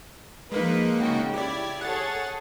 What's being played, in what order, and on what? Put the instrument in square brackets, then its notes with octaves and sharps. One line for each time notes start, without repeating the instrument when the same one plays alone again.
[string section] F3 B4 [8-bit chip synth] G#3 A#3 D#4
[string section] C#3 F#4 G5
[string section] E4 G#6 [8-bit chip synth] G4 D5
[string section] G#4 A4 C#5 [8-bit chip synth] F#5 A6